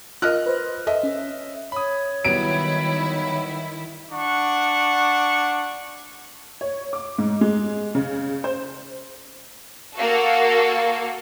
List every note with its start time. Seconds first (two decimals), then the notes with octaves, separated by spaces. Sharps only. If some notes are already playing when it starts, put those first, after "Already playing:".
0.22 F4 A#4 D#5 F6 F#6
0.46 B4 C5
0.87 A4 D#5 E5
1.03 C#4
1.72 C#5 B5 D#6
2.25 D#3 F#3 G3 B3 E4 D7
4.12 D4 F#5 C#6
6.61 C#5
6.93 D6
7.18 G#2
7.41 G#3
7.95 C#3
8.44 C5
9.97 A#3 F#4 A4